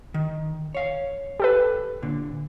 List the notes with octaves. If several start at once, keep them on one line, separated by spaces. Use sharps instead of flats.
D#3
C#5 F5
G4 A4 B4
A#2 D3